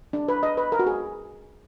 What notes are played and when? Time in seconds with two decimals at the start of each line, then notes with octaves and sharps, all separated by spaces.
0.13 D4
0.28 B4
0.43 D#5
0.57 B4
0.72 A#4
0.79 F#4
0.87 G#4